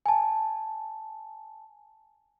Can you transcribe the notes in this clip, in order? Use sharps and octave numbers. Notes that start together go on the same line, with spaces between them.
G#5 A5